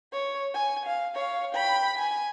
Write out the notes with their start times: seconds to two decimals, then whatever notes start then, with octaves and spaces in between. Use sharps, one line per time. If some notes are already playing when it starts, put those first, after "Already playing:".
0.13 C#5
0.54 G#5
0.86 F5
1.15 C#5 F5
1.54 G5 B5
1.96 G#5